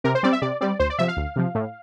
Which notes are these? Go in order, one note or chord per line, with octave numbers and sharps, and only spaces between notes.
C3 A#4
C5
G3 C4 D5
E5
C3 D5
G3 C4 D5
D2 C5
D5
C3 F3 E5
F5
D2
C3 F3
A2